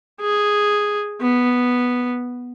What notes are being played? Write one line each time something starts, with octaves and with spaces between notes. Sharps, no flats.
G#4
B3